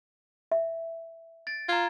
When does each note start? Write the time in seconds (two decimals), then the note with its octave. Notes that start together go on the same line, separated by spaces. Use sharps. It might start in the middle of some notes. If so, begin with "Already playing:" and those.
0.52 E5
1.47 A6 D7
1.69 F4 A#5 G#6